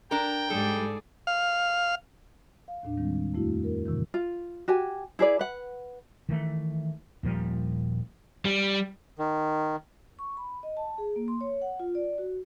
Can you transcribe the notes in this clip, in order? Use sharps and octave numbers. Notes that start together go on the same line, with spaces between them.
D4 A#4 G5 A#5
G#2 G3 G#4 A4 D5
F5
F5
D#2 A2 D4
D#3 G3 G#3 C4
F2 A3 E4 F#4
A#4
A2 C3 D#3 E3
F4
F#4 G4 G#5
E4 G#4 B4 D5
B4 F#5
D#3 E3 A3
D#1 A#2 F3 G3
G3
D#3
C#6
B5
D#5
A5
G#4
A#3
C6
C#5
F#5
F4
D5
F#4